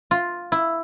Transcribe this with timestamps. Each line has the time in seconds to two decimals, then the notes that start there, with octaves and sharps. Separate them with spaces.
0.11 F4
0.52 E4